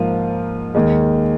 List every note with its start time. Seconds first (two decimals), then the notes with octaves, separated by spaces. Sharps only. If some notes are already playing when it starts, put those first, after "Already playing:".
Already playing: G#2 F3 A#3 F4
0.75 D#2 D#3 G#3